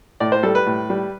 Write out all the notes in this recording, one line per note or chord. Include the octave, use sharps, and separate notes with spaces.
A2 D5
C5
G3 A4
B4
A2
G3